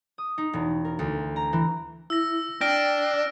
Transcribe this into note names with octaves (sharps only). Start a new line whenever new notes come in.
D#6
D#4
E1
A#4
D2
A#5
E3
E4 E6 A#6
D4 G5 F6 A#6 D7